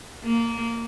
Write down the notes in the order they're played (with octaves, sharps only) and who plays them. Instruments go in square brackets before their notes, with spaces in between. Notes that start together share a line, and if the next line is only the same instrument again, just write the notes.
[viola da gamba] A#3